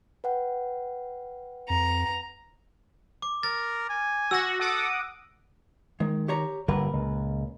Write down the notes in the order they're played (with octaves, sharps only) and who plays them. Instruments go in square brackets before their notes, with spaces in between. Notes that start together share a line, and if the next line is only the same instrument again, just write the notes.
[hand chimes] B4 F#5 G5
[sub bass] F2 [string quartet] A#5
[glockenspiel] D6
[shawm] A#4 [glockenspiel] A6
[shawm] G#5
[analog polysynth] F#4 [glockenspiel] E6 A#6
[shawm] A4 [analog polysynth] F#5 D6 D#6
[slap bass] D#3 [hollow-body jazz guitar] G#3
[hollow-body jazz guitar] G4 C#5 A#5
[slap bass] G1 D3 G3 [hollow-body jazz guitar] A#2 A#4 B4
[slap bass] C#2